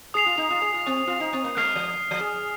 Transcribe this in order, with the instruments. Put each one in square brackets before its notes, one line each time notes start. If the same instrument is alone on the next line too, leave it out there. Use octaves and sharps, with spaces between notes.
[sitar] G#4 [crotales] D#6 C7 F7
[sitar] F4
D#4
F4
G#4
F4
C4
F4
D#4
C4
A#3
[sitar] G#3 [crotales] F6 C7 F7
[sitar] F3
F3
G#4